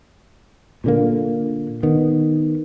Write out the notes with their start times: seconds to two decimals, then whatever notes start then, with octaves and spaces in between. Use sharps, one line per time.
0.84 A#2 D3 A#3
1.83 D#3 B3